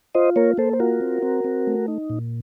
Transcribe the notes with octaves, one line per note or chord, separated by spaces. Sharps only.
F4 C5 D#5
A#3 A#4 C#5
A#3 A4 C5
C5
F4 F#4 A#4
C4
C4
C4
A3
D#4
A#2